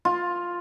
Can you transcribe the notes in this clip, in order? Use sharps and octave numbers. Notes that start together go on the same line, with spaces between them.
F4